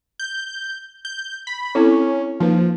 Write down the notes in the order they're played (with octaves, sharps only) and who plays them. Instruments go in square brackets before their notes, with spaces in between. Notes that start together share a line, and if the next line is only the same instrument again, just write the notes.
[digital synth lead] G6
G6
B5
[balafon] C4 E4 A4 [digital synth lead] C#4
[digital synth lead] F3 [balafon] A#3 D#4 B4